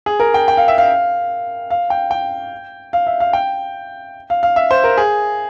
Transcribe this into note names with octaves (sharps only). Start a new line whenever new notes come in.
G#4
A#4
G5
G5
F5
E5
F5
F5
G5
G5
F5
E5
F5
G5
F5
F5
E5
C5
A#4
G#4